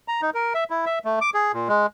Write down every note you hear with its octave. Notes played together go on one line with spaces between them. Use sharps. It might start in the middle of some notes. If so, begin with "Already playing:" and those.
A#5
D#4
A#4
E5
E4
E5
A3
D6
G#4
A#2
G#3